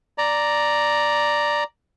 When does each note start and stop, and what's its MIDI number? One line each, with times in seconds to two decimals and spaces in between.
0.18 1.64 74
0.18 1.64 82